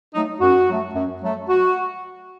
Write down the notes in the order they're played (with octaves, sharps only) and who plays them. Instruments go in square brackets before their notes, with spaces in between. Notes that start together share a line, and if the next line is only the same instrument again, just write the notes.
[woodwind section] F#3 A3 D#4
F#2 F#4
F#3 A3
F#2
F#3 A3
F#4